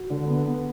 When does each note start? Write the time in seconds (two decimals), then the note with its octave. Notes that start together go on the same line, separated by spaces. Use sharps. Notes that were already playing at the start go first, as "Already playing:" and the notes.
Already playing: F#4
0.10 D3
0.28 B3
0.46 B3